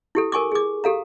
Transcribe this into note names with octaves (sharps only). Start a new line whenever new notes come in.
E4 G4 A4
A#4 G#5 C#6 D6
G#4 D6
G4 A4 F5 A#5